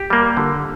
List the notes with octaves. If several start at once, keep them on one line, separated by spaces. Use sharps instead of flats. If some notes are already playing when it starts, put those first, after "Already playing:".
Already playing: G4
G3 A#3
D3